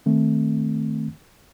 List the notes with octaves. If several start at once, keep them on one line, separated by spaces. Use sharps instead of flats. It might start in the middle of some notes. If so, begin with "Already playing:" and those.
D#3 A3 C4